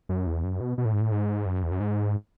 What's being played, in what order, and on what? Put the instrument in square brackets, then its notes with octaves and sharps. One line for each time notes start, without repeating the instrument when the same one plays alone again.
[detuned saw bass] F#2
E2
F#2
B2
B2
A2
G#2
A2
G#2
F#2
E2
F#2
G#2